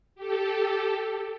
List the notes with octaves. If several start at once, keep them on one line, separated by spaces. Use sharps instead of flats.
G4 A4